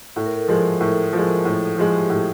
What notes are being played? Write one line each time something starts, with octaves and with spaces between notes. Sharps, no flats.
A2 A4
A#4
A4
F3 G#3
A2
F3 G#3
A2
F3 G#3
G4
G#4
A2 A4